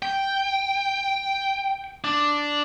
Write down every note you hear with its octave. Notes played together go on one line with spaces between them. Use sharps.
G5
D4